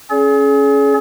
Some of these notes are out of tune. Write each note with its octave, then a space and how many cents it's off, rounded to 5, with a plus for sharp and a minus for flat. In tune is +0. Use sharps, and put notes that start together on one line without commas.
C#4 +0 G#4 +35 D5 -45